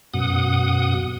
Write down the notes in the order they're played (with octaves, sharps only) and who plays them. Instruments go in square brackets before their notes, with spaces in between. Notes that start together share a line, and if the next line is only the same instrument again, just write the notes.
[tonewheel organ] F#2 B2 F#5 D#6